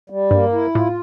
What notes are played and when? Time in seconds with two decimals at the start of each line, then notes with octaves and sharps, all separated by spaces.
0.10 G3
0.31 G2 A#3
0.53 E4
0.75 A2 F4